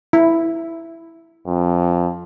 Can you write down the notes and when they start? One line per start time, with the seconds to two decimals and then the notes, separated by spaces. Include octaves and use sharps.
0.13 E4
1.47 F2